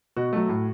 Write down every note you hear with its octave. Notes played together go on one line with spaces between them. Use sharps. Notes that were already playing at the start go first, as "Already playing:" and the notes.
B2 F#4
F#3 A3
A2